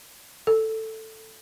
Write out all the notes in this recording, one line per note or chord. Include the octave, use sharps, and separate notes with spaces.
A4